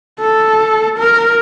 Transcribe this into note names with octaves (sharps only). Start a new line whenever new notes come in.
A4
A#4